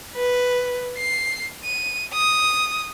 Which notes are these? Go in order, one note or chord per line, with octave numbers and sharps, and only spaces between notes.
B4
C7
D#7
D#6